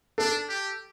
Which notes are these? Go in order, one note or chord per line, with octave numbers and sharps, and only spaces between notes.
D4 A4
G4